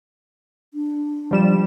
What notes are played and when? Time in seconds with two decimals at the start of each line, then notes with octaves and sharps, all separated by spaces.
0.74 D4
1.31 F3 G3 E7